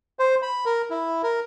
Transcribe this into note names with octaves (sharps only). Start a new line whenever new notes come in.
C5
B5
A#4
E4
A#4